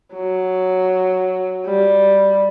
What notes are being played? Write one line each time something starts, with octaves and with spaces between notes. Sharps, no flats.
F#3
G3